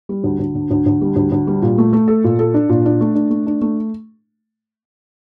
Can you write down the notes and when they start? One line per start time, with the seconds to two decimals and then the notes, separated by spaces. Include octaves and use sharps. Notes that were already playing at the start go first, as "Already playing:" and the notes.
0.09 G3
0.24 D2
0.39 D2
0.55 D3
0.71 D2
0.86 D2
1.01 G3
1.16 D2
1.32 D2
1.47 G3
1.62 A#2
1.78 A3
1.93 A3
2.08 A4
2.24 A#2
2.39 A4
2.54 D4
2.69 A#2
2.85 D4
3.01 A3
3.15 D4
3.30 A3
3.47 D4
3.61 A3